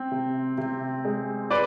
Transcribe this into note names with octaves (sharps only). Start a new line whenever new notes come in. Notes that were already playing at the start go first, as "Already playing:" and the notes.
Already playing: C4
C3
C3
G#3
B4 D5